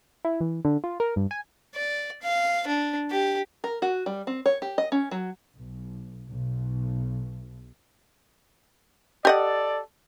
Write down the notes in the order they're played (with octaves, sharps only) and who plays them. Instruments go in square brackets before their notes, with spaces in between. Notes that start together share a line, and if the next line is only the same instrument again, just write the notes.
[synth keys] E4
E3
D3
F4
A#4
G2
G#5
[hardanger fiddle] D5
F5
D4
G4
[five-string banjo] A#4
F#4
G3
C4
C#5
G4
D#5
C#4
F#3
[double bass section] B1
B1
[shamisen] G4 D#5 F#5 [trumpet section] A4 D5